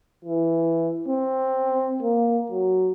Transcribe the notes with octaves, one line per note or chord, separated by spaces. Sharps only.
E3
C4
A#3
F#3